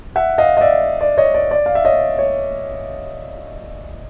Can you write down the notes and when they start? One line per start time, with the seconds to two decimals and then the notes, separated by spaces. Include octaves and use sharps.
0.16 E5 F#5
0.38 D#5 F5
0.57 D#5
0.61 D5 E5
1.01 D5
1.18 C#5 D#5
1.34 D5
1.51 D5
1.66 F5
1.75 E5
1.85 C#5 D#5
2.18 C#5